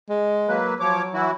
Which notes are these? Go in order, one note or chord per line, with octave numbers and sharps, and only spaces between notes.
G#3
F#3 A#3 B4
F3 F#3 C#5 D6
E3 E4 F#4